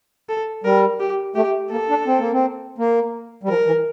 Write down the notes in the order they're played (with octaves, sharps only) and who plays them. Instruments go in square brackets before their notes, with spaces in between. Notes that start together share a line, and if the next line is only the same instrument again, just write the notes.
[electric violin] A4
[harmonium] G3 [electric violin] A#4
[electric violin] G4
[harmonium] A3 [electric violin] G4
[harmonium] A#3 [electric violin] A4
[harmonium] D4
C4
A#3
C4
A#3
G3
[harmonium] F3 [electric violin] A#4
[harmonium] E3